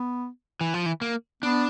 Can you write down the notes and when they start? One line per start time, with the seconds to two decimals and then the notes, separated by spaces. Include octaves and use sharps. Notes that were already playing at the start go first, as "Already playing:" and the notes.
Already playing: B3
0.61 E3
0.74 F3
0.86 E3
1.01 A#3
1.43 B3 D4